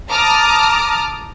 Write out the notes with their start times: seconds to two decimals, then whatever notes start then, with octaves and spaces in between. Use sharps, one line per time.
0.11 A5 A#5 D6 D#6 F6